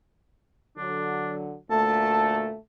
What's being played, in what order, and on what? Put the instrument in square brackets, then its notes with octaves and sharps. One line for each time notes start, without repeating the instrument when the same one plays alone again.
[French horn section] D3 F#3 [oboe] D4
[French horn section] D2 A#2 A3 [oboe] A4 [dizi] A5